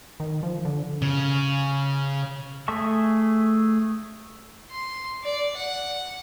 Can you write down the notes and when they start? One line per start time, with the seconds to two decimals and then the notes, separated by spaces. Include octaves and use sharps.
0.20 D#3
0.43 F3
0.65 D3
1.02 C#3
2.68 A3 G#4 E5 A5 C#6
4.71 C6
5.23 D5
5.57 F#5